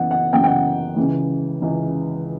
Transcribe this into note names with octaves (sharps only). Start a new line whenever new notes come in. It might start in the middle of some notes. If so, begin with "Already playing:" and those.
Already playing: F#2 E3 B3 F#5
F#5
F#2 E3 B3 G5
G5
F#5
C#2 C#3 E3
C#2 C#3 E3